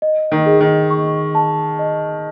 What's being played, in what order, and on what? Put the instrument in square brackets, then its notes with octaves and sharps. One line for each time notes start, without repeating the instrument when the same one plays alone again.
[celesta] D#5
[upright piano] D#3
[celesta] G#4
[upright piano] D#3
[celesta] C#6
A5
D#5